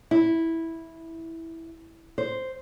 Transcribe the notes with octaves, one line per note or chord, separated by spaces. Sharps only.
E4
C5